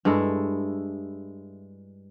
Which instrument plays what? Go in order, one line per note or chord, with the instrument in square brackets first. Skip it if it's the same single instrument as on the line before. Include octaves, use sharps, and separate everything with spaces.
[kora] G2 G#3 E4 A4